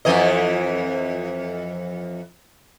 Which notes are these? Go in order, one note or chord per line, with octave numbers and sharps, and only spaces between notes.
F2 E3 D#5